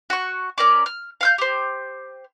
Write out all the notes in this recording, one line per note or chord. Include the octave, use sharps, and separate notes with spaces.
F#4 C#6
C#4 A#4 D5 D6
F6
F5 F6 G6
G4 C5